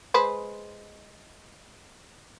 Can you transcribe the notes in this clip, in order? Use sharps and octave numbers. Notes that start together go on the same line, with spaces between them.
G#3 B4 C5